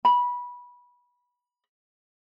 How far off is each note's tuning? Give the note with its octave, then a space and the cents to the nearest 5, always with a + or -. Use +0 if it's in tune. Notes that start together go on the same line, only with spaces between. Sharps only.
B5 -15